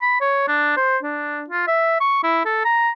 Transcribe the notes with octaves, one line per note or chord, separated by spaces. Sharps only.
B5
C#5
D4
C5
D4
F4
E5
C#6
E4
A4
A#5